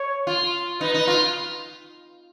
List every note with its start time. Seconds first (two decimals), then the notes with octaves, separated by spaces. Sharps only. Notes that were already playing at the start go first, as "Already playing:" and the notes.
Already playing: C#5
0.27 F4
0.81 D#4 B4
0.94 D#4
1.08 F4